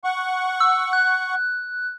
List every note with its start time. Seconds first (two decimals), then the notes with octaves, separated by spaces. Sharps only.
0.04 F#5 C#6
0.60 E6
0.93 F#6